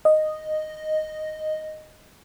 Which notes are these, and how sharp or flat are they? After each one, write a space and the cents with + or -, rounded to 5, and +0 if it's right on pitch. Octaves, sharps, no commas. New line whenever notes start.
D#5 -5